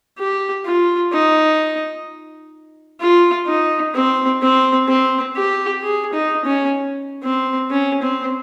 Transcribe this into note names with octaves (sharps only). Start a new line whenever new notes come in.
G4
F4
D#4
F4
D#4
C4
C4
C4
G4
G#4
D#4
C#4
C4
C#4
C4